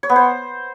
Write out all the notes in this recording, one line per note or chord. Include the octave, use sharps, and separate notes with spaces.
C#5
B3
C5